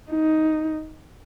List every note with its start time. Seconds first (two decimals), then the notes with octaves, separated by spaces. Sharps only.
0.11 D#4